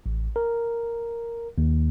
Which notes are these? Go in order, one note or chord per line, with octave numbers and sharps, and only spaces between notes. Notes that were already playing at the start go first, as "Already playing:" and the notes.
A1
A#4
D#2